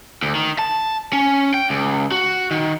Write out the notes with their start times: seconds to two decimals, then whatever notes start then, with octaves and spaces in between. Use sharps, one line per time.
0.23 D2
0.35 D#3
0.59 A5
1.13 C#4
1.54 G5
1.70 C#2
2.12 F#4
2.51 D#3